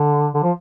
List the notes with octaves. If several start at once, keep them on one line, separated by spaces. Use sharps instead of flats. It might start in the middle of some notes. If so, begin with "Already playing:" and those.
Already playing: D3
D3
F3